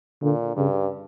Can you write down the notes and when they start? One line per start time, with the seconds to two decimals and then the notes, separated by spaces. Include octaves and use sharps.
0.22 A#2 D3
0.56 G2 C#3